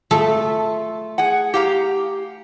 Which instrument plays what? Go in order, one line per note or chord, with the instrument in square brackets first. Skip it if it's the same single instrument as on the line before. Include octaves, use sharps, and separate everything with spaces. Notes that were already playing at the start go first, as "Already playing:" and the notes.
[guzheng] A3 A4 E5 [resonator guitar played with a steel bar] F4
[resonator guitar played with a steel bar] G#4 F#5
G4 F5 A#5